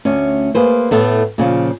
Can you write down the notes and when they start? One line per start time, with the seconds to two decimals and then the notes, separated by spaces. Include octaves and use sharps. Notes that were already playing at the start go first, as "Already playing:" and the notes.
0.05 D2 C#4
0.55 A#3 G#4 B4 C5
0.91 A2 A3 B3
1.38 A#2 C#3 F3